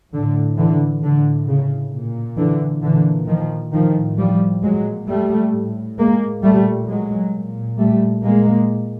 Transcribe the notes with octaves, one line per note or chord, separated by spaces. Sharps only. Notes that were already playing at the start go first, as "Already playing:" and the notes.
A2 D3
D3 E3
A2 D3
C#3
A#2
D3 E3
A#2 D3 E3
D#3 F3
A2 D#3 F3
F3 G3
A#2 F#3 G#3
G3 A3
A2
G#3 A#3
A#2 G3 A3
F#3 G#3
A#2
G3 A3
A#2 G#3 A#3